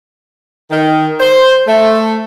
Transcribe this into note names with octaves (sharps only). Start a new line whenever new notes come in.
D#3
C5
A3